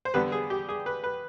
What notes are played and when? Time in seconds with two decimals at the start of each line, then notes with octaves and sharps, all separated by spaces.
0.05 C5
0.14 D3 G3 B3 D4 B4
0.32 G#4
0.50 G4
0.69 G#4
0.86 B4
1.04 B4